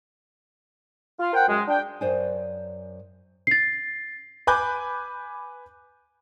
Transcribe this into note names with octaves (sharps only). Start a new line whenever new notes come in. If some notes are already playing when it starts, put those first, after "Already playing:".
F4
A#4 C5 F#5 G5
F#2 G#3
D4 G5
F#2 C5 D5 F5 G#5
A6 C7
B4 G#5 B5 D6 F#6 G6